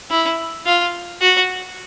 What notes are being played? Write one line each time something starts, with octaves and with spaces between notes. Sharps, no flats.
E4
F4
F#4